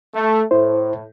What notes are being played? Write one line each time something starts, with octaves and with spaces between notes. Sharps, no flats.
A3
A2 E4 C5